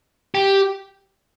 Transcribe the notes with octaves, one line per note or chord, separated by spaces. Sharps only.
G4